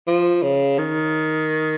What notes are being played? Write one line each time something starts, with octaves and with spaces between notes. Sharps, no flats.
F3
C#3
D#3